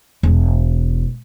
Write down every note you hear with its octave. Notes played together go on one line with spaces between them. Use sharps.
E1